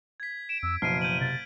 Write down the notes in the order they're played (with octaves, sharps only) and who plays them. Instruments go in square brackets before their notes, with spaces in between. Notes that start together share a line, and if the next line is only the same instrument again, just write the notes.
[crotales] G#6 B6
[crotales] D7 [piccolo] E7
[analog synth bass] F2 [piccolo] E6
[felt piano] F#1 B2 [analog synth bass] F3 [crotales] F6 D7 D#7 [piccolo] C7
[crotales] G6 F#7 [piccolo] D#7
[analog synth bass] C3 [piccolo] A6